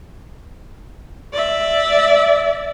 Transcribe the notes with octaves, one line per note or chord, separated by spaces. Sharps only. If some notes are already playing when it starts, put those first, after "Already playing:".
D5 E5